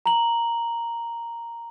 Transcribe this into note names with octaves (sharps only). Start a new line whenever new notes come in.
A#5 F#7